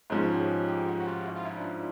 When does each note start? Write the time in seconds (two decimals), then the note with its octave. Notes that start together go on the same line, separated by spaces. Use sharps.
0.10 G#2 F3 G#3 C#4 C#5
0.33 G4
0.39 G#4
0.68 G4
0.88 F#4
1.00 F#4
1.07 F4
1.27 E4
1.36 F4
1.45 E4
1.56 D4